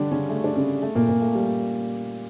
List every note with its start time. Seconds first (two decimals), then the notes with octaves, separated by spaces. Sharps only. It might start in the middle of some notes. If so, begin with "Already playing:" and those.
Already playing: D3 G3 D4 G4
0.11 C#3 C#4
0.29 A3
0.44 D4
0.56 C#3 C#4
0.82 A3
0.95 A#2 A#3
1.08 A#2 A#3
1.22 A3
1.35 G3